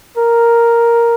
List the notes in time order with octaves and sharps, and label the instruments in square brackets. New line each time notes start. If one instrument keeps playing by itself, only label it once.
[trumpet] A#4